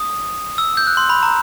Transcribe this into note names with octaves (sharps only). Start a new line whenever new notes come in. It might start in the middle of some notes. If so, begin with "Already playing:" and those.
Already playing: D#6
E6
G6
F#6
C6
B5
A#5